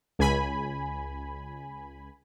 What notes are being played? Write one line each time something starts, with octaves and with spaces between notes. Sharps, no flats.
C#2 G#5 B5